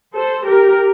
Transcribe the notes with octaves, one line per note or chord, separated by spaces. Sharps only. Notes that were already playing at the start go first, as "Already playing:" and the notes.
A4 C5
G4 A#4